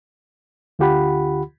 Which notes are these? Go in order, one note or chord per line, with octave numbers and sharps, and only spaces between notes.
D2 D3 F4 G4 F#5 B5